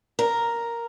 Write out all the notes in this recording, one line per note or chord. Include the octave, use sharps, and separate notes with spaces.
A#4